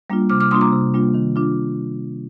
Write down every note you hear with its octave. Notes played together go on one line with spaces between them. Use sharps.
G3 A#3 D4 F4
C3 D6 F6
D6 F6
G3 A#3 D4 F4 C6 D#6
A#5 D6
C3
G3 A#3 D4 F4
D#3
D4 F4